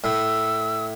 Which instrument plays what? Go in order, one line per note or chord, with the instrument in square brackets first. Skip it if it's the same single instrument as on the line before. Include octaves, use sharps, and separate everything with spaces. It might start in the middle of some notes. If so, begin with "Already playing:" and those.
[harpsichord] A2 [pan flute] E6